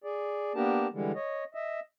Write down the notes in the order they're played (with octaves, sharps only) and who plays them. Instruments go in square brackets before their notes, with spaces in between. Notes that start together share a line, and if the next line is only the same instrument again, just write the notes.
[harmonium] G#4 D5
A#3 B3 D4 G4 A#4 A5
D3 E3 G3 G#3
C#5 D#5
D#5 E5